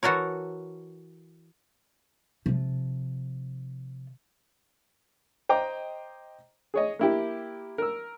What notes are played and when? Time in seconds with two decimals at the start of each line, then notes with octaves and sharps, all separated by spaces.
0.03 E3 F#4 A4 A#4 C#5
2.46 C3 F3
5.49 C5 D#5 G5 A#5 D6
6.74 G#4 C#5 D#5
6.99 A#3 E4 G4
7.78 A#4 E6